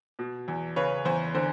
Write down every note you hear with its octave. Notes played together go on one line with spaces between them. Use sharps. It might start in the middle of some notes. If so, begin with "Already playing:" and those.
B2
E2
C#3 B4 C#5
E2 C5
D3 C5